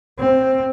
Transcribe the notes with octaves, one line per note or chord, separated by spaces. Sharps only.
C4